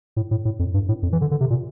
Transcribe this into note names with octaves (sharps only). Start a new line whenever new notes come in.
A2
A2
A2
F2
G2
A2
F2
E3
D3
D3
C3
A#2